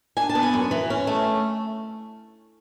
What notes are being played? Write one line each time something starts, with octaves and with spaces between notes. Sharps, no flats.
D4 G#5
A5
B3
G#5
F#2
E3
C#4
A3